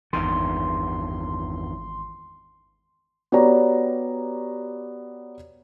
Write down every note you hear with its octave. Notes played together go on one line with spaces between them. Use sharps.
G#1 E2 G2 D#3 C6
B3 F#4 G4 C#5 D5 A#5